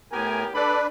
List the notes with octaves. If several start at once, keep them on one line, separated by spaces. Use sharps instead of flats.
A2 B3 G4 A#4 G#5
D4 A4 B4 D5 B5